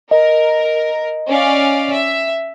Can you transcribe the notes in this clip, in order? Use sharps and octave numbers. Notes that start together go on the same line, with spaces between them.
A#4 D#5
C#4 D5 F5
E5